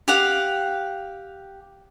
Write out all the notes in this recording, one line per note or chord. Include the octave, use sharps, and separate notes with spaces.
G4 F5 F#5